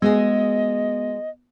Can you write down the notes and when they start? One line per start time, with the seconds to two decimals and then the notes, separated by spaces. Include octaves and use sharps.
0.02 G#3 B3 F#4 G#4 D#5